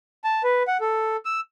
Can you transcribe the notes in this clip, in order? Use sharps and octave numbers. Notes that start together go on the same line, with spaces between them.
A5
B4
F#5
A4
E6